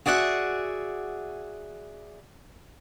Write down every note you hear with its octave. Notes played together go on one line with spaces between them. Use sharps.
F#4 G#4 D5 E5 F#5